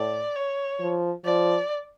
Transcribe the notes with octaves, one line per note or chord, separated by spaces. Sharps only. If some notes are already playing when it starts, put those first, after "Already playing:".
Already playing: A2 D5
C#5
F3
F3 D5